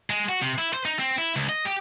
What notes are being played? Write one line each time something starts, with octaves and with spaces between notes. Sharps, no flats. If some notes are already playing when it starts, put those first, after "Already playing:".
G#3
F#4
C3
E4
C5
D#4
C4
E4
C#2
D#5
G4